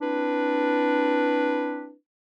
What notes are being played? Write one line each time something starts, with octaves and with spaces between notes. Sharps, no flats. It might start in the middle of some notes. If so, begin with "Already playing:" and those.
C4 D4 E4 B4